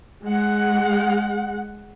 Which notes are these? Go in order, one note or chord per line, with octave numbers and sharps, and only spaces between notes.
G#3 F#5